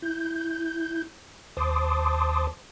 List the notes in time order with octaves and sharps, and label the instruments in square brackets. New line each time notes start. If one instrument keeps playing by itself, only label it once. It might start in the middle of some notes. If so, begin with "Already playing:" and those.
[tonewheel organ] E4 G6
D#2 C5 A5 C6 D6 D#6